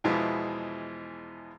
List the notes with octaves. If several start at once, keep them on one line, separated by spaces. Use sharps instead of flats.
E2 B2 E3 F3 G#3